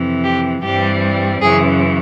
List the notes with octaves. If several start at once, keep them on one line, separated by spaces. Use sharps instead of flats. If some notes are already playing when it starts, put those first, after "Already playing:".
Already playing: F2 C3 E3
G4
G2 E3 G3 C4 G4
F#2 C#3 E3 G#4